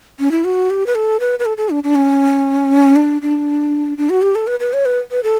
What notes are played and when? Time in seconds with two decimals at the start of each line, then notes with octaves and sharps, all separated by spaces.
0.20 C#4
0.31 E4
0.44 F#4
0.70 G4
0.86 B4
0.95 A4
1.20 B4
1.39 B4
1.46 A4
1.57 A4
1.70 D4
1.84 D4
1.95 C#4
2.96 D4
3.22 D4
3.98 D4
4.10 F#4
4.22 G4
4.35 A4
4.47 B4
4.60 B4
4.73 C#5
4.85 B4
5.11 B4
5.23 A4